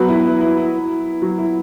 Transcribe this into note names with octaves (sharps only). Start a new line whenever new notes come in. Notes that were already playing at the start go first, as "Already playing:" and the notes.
Already playing: F#3 B3 F#4 B4
E4
E4
E4
E4
F#3 F#4
E4